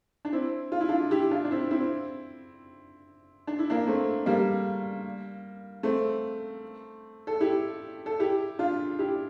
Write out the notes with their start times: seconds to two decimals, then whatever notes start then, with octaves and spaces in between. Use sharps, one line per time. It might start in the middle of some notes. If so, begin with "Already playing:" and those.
0.25 D4
0.32 C4 E4
0.72 F4
0.81 E4
0.89 D4 F4
1.11 E4 G4
1.31 D4 F4
1.45 D4
1.51 C4 E4
1.71 C4 E4
3.47 D4
3.59 E4
3.70 A#3 D4
3.87 A3 C4
4.26 G3 A#3
5.83 A3 C4
7.27 A4
7.41 E4 G4
8.06 A4
8.20 E4 G4
8.59 D4 F4
8.99 E4 G4